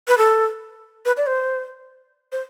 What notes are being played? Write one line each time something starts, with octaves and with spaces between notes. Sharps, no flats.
B4
A4
B4
D5
C5
C5